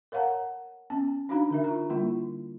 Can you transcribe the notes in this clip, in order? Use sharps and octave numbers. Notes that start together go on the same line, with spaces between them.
A#4 C#5 F5 F#5 A5 A#5
B3 C#4 A5
D4 D#4 F#4 F5 A#5 B5
D3 A#4 E5
F4 A#5
D3 G3 A#3 E4 F4